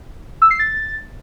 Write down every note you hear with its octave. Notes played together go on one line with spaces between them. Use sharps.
E6
C7
A6